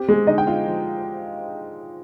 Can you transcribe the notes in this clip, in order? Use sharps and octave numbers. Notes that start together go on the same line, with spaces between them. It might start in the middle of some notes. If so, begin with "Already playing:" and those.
Already playing: C4 G4
G#3 G#4
D3 D#4 D#5
G5
F4 F5
F3